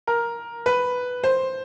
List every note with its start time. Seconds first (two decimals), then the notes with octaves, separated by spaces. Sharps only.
0.07 A#4
0.66 B4
1.24 C5